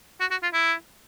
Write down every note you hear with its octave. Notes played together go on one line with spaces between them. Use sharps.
F#4
F#4
F4
E4